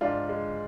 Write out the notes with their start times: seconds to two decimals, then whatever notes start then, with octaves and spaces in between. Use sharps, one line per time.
0.01 G#2 D4 F4
0.29 G#3